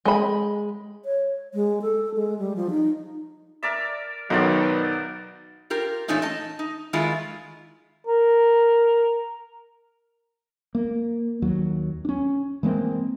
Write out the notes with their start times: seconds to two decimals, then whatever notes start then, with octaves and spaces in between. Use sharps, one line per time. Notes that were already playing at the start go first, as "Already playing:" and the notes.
0.06 G#3 B5
1.05 C#5
1.54 G#3
1.82 A4
2.15 G#3
2.39 G3
2.56 F3
2.70 D#4
3.63 A#4 D5 E5
4.30 B1 D#3 F#3 B3 A#4 C5 D5
5.70 F4 G4 A#4
6.08 A#2 E3 A3 C#4 D#4 F4
6.22 D#5 A5
6.59 D#4
6.93 D#3 G#3 E4 F4
8.07 A#4
10.75 A#3
11.42 D#2 F#3
12.05 C#4 D4
12.63 E3 G#3 A#3 C4